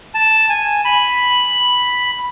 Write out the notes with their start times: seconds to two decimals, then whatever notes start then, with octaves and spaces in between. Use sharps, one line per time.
0.14 A5
0.49 G#5
0.85 B5